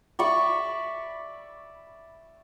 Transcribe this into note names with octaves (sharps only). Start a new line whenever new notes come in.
D5 E5 B5 C#6